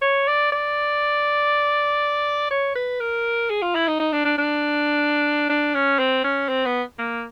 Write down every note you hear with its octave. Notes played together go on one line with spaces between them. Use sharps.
C#5
D5
D5
C#5
B4
A#4
G#4
F4
E4
D#4
D#4
D4
D4
D4
D4
C#4
C4
C#4
C4
B3
A#3